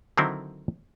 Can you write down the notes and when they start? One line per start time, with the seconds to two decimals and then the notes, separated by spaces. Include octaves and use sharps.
0.18 D3 D#3 F#3 C4 D#4 E4